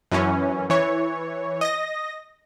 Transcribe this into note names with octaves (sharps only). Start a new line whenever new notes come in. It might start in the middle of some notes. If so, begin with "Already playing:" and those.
F#2 E3 C#4
E3 C#5
D#5 A#6